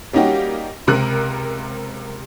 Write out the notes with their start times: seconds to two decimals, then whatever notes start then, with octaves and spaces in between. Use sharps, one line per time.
0.13 G3 A#3 C#4 D#4 F#4 G4
0.87 C#2 C3 A#4 F#6